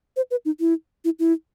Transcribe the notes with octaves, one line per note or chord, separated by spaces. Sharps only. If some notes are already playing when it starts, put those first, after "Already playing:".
C5
B4
D#4
E4
E4
E4